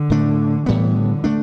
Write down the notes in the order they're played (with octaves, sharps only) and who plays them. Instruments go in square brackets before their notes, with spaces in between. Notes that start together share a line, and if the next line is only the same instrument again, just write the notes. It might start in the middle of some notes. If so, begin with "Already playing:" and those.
Already playing: [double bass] D3
[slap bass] A2 A3 D4
[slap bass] A2 G3 B3 [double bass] E3
[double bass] D3
[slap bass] A3 D4